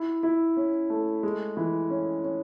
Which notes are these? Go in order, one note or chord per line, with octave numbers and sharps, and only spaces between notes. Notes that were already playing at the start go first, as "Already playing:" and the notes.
Already playing: E4
E4
C#4
A3
G#3
E3
C#4
C#4